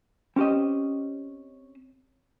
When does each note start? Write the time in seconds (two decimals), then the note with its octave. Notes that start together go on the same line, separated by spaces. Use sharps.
0.36 C4 C#4 G4 C5 D#5